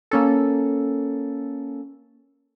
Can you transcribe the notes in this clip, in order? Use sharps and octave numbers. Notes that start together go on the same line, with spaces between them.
A#3 C#4 A4